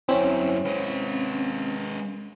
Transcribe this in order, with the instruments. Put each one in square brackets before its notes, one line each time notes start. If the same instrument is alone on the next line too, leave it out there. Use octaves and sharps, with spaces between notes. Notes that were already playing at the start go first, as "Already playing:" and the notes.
[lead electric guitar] F#2 E4 [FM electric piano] C4 C#4
[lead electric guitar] G#3 B4